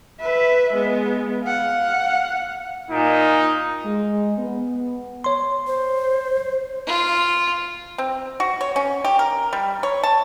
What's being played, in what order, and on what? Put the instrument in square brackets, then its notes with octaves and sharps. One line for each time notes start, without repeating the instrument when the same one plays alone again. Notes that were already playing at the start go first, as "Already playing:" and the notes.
[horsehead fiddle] B4 E5
G#3 B3
F5 F#5
[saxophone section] A#2 [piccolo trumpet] D#4
[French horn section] G#3
B3
[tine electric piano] C#5 C6
[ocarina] C5
[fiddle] F4
[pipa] C4
F#4
C#5
C#4
G4
A#4
G3
C#5
A5